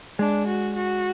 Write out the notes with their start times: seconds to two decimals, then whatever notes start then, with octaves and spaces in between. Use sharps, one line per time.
0.19 G#3 D4
0.47 F#4
0.76 F#4